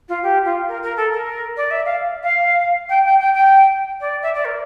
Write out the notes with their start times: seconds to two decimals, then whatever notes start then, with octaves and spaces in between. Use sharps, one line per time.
0.08 F4
0.23 G4
0.44 F4
0.68 A#4
0.82 A#4
0.96 A4
1.12 A#4
1.56 D5
1.70 E5
1.85 F5
2.23 F5
2.89 G5
3.05 G5
3.19 G5
3.33 G5
4.00 D5
4.22 E5
4.34 D5
4.45 A#4